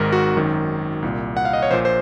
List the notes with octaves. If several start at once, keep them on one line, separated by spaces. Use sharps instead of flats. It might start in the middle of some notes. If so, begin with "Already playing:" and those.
Already playing: G#1 G#2 D#3 A#4
F#4
G#1 F#2 D#3
C2 A#2
F#5
F5
D#5
C#5
A#1 A#2 C5
C5